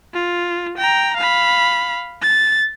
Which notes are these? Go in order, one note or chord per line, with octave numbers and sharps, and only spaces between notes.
F4
G5 A#5
F5 B5
A6